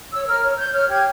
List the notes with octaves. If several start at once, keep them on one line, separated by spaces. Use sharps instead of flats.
C#5 E6
A#4 F6
C#5
C#5 G6
C#5 F6
G4 G#6